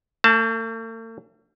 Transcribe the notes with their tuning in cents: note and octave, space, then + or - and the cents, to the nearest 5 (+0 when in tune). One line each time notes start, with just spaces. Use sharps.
A3 +45 A5 +0